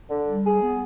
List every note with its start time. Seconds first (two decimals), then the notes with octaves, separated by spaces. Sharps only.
0.09 D3
0.27 G3
0.44 G#4
0.62 B3